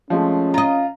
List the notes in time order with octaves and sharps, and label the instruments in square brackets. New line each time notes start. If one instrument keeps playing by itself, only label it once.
[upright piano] F3 G#3 A3 [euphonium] C#4
[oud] F4 D#5 [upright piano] A#5